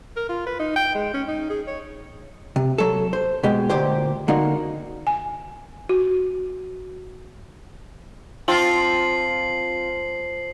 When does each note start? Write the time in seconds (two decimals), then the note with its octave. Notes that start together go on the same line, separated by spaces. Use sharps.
0.17 A#4
0.29 F4
0.46 B4
0.59 D#4
0.76 G5
0.95 G#3
1.14 C#4
1.28 D#4
1.50 G#4
1.67 C#5
2.56 C3
2.78 F#3 A4
3.13 C5
3.43 B2 G#3 G4
3.70 D2 A#2 G4 C5
4.28 D3 A#3 D#4 F#4 A#4 F5
5.07 G#5
5.89 F#4
8.48 F3 C4 F4 C7 F#7